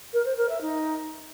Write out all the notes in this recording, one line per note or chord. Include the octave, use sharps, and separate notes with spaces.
A#4
C5
A#4
E5
D#4